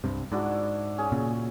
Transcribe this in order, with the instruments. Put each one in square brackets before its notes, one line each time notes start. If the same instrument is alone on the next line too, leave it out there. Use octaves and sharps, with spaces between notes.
[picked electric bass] C2 G2 C3
[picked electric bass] G#2 [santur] D4 E4 F#4
[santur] C#4 G#4
[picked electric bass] A#2 C#3